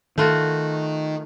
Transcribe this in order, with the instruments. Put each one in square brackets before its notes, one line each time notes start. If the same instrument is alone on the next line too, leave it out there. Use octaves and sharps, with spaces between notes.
[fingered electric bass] D#3 [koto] A3 F4 F#4